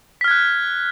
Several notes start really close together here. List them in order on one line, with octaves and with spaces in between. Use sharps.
B6 F6 G#6 F#6